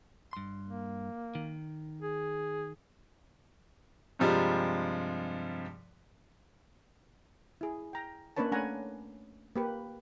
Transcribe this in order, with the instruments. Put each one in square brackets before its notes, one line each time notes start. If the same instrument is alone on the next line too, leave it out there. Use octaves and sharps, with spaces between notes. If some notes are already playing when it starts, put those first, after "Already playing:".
[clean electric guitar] G2 C6
[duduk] A#3
[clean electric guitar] D#3
[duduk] G#4
[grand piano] G2 C3 F3 G3 G#3
[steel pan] E4 G#4
G5 A#5
A#3 C#4 D4 B4 C#5 A5
A3 C#4 D4 F#5 G#5 A#5
A#3 G4 B4